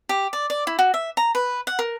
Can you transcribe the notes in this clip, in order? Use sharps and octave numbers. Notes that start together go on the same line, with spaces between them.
G4
D5
D5
E4
F#4
E5
A#5
B4
F#5
A#4